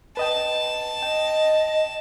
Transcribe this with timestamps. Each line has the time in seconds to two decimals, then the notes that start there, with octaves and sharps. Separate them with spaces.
0.17 B4 D#5 G5 A5
1.02 D#5 G5